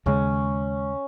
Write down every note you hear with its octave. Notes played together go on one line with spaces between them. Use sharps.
D#2 C#3 G#3 C#4